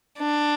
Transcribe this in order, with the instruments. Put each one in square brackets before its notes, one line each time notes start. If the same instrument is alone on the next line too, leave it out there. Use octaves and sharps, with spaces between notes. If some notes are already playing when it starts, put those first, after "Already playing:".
[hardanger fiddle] D4